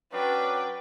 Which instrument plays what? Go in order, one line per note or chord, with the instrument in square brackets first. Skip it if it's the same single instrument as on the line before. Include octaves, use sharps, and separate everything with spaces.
[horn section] F#3 C#4 D4 [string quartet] B4 G5